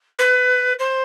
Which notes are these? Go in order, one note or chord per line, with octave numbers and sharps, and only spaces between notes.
B4
C5